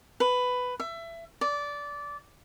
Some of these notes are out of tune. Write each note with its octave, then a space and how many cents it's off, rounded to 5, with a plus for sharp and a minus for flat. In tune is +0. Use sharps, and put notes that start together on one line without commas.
B4 +10
E5 +25
D5 -15